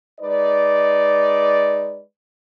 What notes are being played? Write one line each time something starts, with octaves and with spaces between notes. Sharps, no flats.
G#3 D#4 B4 D5